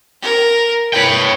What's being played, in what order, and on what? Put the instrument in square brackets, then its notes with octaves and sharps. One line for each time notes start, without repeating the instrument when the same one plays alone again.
[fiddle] A#4
[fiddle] B4 [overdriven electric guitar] C#5 G5